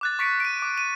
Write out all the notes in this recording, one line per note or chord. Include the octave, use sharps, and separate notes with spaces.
D6 F#6 A6
C#6 A6 B6 C#7 D7
D7 D#7
D6
D#7